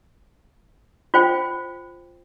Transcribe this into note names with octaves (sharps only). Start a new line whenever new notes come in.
F4 C5 G5